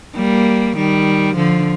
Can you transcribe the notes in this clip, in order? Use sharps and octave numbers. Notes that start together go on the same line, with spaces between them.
G3 A#3
D#3 G3
D3 F3